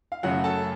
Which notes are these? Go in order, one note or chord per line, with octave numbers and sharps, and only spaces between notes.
F5
F#2 C#3 F#3 A3 C#4 F#4 F#5
A4 A5